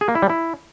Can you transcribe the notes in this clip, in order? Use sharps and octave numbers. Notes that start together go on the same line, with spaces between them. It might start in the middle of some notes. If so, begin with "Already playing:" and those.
G#4
A#3
E4
G3
E4